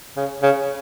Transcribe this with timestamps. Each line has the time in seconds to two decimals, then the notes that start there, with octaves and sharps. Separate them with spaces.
0.17 C#3
0.43 C#3